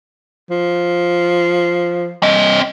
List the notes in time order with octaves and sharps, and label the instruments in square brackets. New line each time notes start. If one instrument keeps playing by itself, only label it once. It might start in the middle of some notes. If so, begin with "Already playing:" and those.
[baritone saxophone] F3
[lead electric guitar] C4 D#5